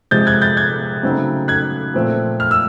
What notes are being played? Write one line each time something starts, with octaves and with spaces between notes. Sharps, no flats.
C3 F3 G#3 G6 A6
F#6 G#6
G6 A6
F#6 G#6
C#3 F#3 A3 C4 D#4
F#6 G#6
A#2 F3 A3 C4
F6
E6